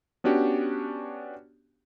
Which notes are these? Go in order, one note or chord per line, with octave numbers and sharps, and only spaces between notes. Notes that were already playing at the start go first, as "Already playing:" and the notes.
B3 C#4 D4 F#4 G4